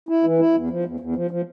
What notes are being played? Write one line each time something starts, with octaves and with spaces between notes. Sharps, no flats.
E4
E3
E4
E2
F3
E2
E2
F3
F3